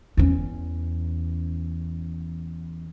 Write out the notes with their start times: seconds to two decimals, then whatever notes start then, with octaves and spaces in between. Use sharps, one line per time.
0.17 E2 C#4